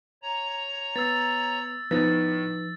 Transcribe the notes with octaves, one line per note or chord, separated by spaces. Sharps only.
C#5 A#5
B3 E6 A6
A2 F3 B3 D#4 A6